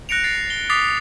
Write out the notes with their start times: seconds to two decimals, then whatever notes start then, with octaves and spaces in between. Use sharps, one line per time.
0.09 F#6 A#6 C#7 D7 F7
0.24 A6 C7
0.50 G7
0.70 D6 D#6 A6 B6 C7 F7